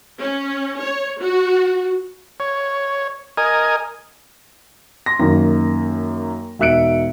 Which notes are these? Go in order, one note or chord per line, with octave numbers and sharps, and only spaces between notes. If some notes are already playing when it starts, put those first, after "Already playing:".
C#4
C#5
F#4
C#5
A#4 D#5 G#5
C6 A#6
F#2 D#3 A#3 A#6
E1 D#4 E5 F#6 C#7 D7